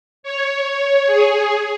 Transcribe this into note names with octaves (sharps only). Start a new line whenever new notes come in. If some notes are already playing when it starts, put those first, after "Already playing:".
C#5
G#4